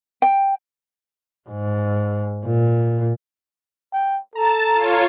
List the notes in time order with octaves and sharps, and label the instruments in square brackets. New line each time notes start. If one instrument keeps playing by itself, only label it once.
[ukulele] G5
[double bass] G#2
A#2
[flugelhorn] G5
[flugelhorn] A4 [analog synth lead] A#5 [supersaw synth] A6 E7
[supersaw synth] F4 C#5